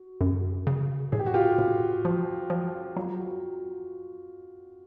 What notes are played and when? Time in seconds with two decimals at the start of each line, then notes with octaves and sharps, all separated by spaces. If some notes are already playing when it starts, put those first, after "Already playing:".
Already playing: F#4
0.21 F#2
0.67 C#3
1.12 A2 G#4
1.20 G4
1.26 F#4
1.34 F4 G4
1.59 A2
2.05 F3
2.50 F3
2.96 F#3 F4
3.19 F#4